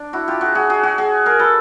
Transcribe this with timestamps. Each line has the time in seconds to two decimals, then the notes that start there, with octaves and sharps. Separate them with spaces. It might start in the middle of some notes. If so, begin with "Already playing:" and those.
Already playing: D4
0.13 E4 F#4
0.28 F4 G4
0.41 F#4 G#4
0.55 F#4 G#4
0.70 F#4 G#4
0.83 F#4 G#4
0.98 F#4 G#4
1.26 G#4 A#4
1.39 A4 B4